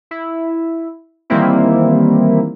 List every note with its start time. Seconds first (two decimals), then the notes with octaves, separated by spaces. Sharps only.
0.11 E4
1.30 D#3 E3 G3 A#3 C4 E4